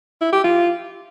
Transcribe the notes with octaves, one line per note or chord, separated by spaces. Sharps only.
E4
G4
F4